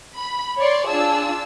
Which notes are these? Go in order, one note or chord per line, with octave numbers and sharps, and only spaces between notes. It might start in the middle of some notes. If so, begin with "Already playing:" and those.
B5
C#5 D5 C6
D4 F4 G#4 A5 E6